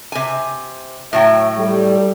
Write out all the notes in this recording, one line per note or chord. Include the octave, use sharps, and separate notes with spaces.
C3 G#5
A2 F#3 E5 G5
G3 A4